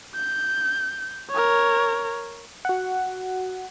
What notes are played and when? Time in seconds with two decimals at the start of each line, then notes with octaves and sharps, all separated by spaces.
0.16 G6
1.30 A#4 C#5
2.65 F#4 F#5